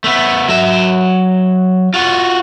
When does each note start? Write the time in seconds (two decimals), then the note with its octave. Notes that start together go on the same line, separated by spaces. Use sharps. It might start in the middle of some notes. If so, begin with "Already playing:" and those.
0.04 A3 B3
0.48 F#3 E5
1.94 F4 F#4